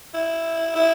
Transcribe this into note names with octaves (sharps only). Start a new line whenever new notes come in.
E4
E4